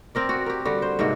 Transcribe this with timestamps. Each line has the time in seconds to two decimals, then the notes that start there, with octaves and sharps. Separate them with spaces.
0.15 C4 A#4 D5
0.29 F#4
0.46 G4 A#4
0.65 D3 G3 F#4
0.82 C5
0.99 G#2 C3 A#3 F#4